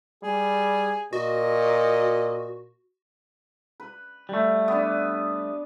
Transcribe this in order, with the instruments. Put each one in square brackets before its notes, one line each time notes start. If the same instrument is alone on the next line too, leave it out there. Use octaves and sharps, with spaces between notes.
[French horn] G3 [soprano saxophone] G#4
[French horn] A#2 [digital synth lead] F#4 [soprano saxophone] D#5
[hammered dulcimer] B4
[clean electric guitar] G3 A3
[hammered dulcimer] B3 D4